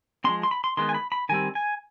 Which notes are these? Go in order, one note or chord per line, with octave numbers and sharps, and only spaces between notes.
F3 G#3 C4 C6
C6
B5
C6
D#3 G#3 B3 C6
G#5
B5
B5
D#3 G3 C4 G#5
G#5